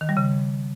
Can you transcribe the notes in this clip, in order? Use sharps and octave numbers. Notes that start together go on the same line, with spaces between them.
D#3
G3
C#3